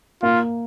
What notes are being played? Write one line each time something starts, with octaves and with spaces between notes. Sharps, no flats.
A#3 F4